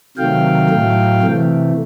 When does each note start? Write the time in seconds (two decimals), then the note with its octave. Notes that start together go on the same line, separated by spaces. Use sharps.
0.17 C3 D#3 F#3 A3 F5 G5
0.70 A2 F#3 A3
1.21 C3 E3 A3